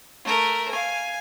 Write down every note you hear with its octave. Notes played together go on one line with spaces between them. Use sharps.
A3 A#4
F5 G#5